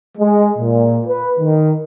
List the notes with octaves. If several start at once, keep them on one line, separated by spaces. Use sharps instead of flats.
G#3
A#2
B4
D#3